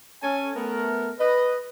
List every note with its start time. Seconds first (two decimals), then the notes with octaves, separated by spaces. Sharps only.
0.22 C#4 A4 G#5
0.56 A3 B3 A#4
1.19 B4 D#5